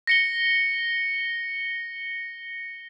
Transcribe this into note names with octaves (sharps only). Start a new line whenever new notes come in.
A#6 C#7 G7